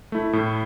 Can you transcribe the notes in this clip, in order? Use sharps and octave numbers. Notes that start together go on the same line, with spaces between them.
A3 E4
A2